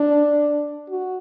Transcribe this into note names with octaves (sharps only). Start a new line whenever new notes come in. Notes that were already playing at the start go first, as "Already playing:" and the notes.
Already playing: D4
F#4